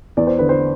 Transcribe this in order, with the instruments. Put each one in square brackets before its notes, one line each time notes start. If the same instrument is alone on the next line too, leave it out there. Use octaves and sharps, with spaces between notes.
[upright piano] E2 D5
C5
D3 B4
C5